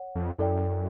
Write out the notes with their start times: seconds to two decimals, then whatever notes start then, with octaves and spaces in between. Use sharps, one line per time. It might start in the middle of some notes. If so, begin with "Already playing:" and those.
Already playing: C#5 F#5
0.15 F2
0.38 F#2 E4 A4 D5 G5